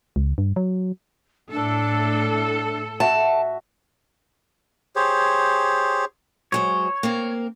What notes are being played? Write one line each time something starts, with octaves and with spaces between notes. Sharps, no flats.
C#2
G2
F#3
A2 D4 A4
F#4 E5 F#5 A5
G4 G#4 C5 C#5
F#3 G#3 C5 C#5
A#3 C4 A#4